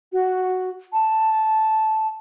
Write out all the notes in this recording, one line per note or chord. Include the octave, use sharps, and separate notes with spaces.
F#4
A5